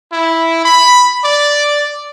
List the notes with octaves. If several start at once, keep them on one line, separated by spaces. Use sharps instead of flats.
E4
B5
D5